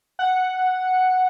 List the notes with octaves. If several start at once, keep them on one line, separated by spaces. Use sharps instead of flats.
F#5